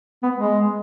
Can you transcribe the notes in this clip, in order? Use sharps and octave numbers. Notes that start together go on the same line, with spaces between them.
B3
G#3